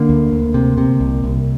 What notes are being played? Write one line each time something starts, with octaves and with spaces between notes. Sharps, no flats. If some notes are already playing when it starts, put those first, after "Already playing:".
Already playing: D3 A#3
D2
D2
C3
C3
C2
C2